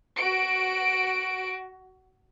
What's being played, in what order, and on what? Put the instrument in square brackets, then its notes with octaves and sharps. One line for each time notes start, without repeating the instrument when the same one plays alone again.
[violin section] F#4 D7